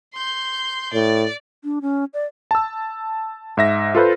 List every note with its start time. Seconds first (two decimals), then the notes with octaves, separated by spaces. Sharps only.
0.14 C6 G6
0.93 A2 D5
1.64 D4
1.82 C#4
2.14 D5
2.51 A5 E6
3.57 G#2 E5 A#6
3.95 F4 A4 B4 C5